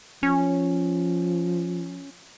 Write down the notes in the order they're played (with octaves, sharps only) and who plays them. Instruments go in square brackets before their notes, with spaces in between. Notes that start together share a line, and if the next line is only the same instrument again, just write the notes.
[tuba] F3 [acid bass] C#4